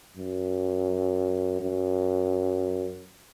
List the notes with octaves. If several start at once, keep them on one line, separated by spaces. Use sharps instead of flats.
F#2
F#2